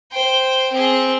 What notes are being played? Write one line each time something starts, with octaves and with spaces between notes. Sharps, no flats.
C5 G5
C4 G#4